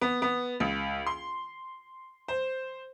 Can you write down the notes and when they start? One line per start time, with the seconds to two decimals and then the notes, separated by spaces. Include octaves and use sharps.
0.01 B3
0.22 B3
0.60 C#2
1.06 C6
2.28 C5